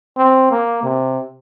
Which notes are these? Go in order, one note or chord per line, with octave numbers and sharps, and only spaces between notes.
C4
A#3
C3